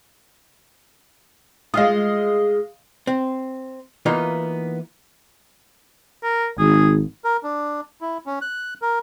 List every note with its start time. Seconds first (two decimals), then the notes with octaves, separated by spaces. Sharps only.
1.74 G#3 F4 D#5 F5 D#6
3.07 C4
4.06 E3 A#3 B3 D#4 F4
6.23 A#4
6.59 G#1 G#4
7.24 A#4
7.43 D4
8.01 E4
8.26 C#4
8.42 F#6
8.82 A#4